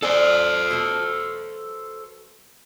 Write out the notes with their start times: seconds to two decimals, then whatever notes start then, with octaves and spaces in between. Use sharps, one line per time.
0.02 F4 A4 C5 D5 G#5
0.70 B2 F#3 A3